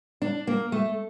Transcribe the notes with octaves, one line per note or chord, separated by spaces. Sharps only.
D4
A#3
A3